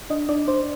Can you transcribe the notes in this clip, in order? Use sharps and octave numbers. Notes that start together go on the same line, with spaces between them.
D4 D#5
D4 D5
D4 C5